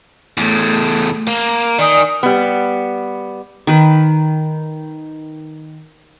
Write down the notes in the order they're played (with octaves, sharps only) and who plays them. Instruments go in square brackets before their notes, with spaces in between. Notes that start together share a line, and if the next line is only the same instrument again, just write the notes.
[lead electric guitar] E2 A2 [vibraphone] A3
[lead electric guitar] A#3
[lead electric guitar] D#3 [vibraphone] D5 G#5 D#6
[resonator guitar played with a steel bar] G3 B3
[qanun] D#3 B4